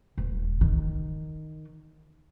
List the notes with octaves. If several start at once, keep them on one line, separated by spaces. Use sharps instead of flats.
D#1
D#3